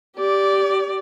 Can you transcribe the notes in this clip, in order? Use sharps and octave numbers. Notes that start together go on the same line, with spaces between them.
G4 D5